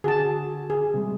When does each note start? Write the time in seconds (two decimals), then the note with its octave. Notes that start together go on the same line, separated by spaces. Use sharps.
0.04 D3 F#4 G#4 A5
0.70 G#4
0.94 C3 G3 G#3